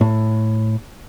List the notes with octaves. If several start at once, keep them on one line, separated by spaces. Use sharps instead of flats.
A2